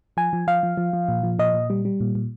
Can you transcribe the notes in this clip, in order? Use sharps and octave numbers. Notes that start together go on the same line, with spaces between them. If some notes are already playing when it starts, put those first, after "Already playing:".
F3 G#5
F3
F3 F5
F3
F3
F3
A#2
F3
A#2 D#5
A#2
G3
G3
A#2
A#2